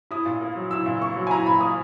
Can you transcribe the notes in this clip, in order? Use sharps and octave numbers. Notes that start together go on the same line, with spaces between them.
E4 D#6
A#2
A#3
F#3
E4 E6
A#2
A#3 C#6
F#3
G#5
E4 A#5
A#2 B5
A#3 D#6